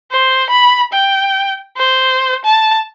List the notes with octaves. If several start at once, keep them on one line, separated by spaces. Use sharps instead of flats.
C5
B5
G5
C5
A5